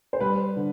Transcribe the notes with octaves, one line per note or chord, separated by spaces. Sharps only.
C5
G3 B4
D3